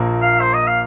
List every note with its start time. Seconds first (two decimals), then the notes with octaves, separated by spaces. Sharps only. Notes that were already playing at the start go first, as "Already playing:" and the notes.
Already playing: A#1 A#2 A#3
0.22 F5
0.41 C5
0.54 D#5
0.67 F5